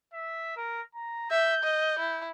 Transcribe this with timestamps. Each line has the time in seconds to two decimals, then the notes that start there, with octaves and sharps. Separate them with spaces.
0.13 E5
0.57 A#4
0.95 A#5
1.31 E5 G6
1.63 D#5
1.99 E4